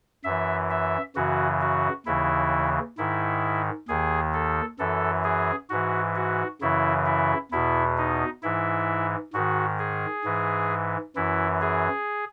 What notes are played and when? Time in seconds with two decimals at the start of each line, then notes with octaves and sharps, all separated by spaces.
0.24 F#2 E3 E5
0.70 E5
1.16 F#2 C#3 E3 F#4
1.61 F#4
2.06 D#2 C#3 E3 E4
2.98 G#2 D#3 E4
3.88 D#2 D#3 G#4
4.34 A4
4.79 F#2 E3 A4
5.24 G#4
5.70 G#2 E3 F#4
6.16 F#4
6.61 F#2 C#3 E3 E4
7.06 E4
7.51 E2 B2 E4
7.98 D#4
8.43 G#2 E3 E4
9.33 G#2 D#3 F#4
9.79 G#4
10.24 G#2 E3
11.16 F#2 E3 E4
11.61 G#4